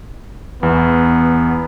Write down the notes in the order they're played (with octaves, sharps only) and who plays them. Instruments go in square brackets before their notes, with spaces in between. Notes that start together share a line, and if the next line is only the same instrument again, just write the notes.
[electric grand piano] E2 [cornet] B3